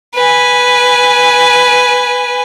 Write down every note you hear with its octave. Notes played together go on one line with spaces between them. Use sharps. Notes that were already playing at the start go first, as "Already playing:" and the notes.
B4 G#5